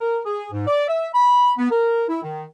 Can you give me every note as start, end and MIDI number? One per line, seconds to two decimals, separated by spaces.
0.01 0.19 70
0.25 0.47 68
0.52 0.64 44
0.67 0.84 74
0.88 1.08 76
1.14 1.52 83
1.58 1.68 59
1.71 2.04 70
2.09 2.21 64
2.23 2.45 51